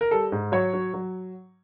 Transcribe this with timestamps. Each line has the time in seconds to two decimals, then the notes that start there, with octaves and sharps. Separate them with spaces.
0.01 A#4
0.11 G3 A4
0.32 G#2
0.52 F#3 C#5
0.74 F#3
0.94 F#3